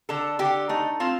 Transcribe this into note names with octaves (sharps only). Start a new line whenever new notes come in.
D3 A4
D3 G4
A3 D#4
C4 F4